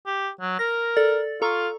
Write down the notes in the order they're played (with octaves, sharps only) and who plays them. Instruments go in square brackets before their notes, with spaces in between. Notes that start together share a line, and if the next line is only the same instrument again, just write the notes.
[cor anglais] G4
F#3
[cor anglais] A#4 [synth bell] A#6
[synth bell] A4 D5 A6
[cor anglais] F4 [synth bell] A4 A#5 C#6